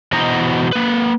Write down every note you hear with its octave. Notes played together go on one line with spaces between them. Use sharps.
B2 E3 F#4 C5 D#5 A#5
A#3 B4